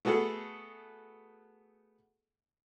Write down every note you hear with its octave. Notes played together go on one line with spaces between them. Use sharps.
A3 B3 F#4 G#4 A4